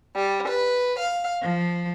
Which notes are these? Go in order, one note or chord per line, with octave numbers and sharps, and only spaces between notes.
G3
B4
F5
F3